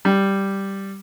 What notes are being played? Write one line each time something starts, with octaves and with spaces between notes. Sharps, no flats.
G3